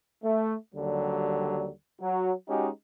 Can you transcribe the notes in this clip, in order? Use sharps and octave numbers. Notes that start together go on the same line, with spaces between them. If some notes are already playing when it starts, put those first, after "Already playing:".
A3
D#2 D3 F#3 G3
F#3
G#3 C#4 D#4 F#4 G4